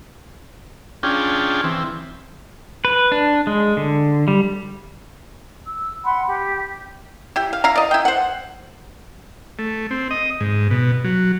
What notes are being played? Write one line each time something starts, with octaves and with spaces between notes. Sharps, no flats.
C#4 D4 F4 G#4 G5
E3 C4
B4
D4
G#3
D3
G3
E6
F#5 B5 C6
G4
E4 G4
F5
E4 F5 A#5
D5 D#5
E4 G5
C5 F#5
A3
C4
D#5
G#2
B2
F#3